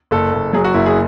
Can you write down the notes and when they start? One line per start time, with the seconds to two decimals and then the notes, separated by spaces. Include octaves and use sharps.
0.11 F#1 A4
0.33 F#1
0.53 F#3 G#4
0.64 F#4
0.74 F#1 E4
0.86 G#4